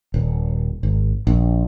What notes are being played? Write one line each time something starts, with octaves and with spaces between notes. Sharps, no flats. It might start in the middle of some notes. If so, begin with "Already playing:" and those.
D#1
G#1
A#1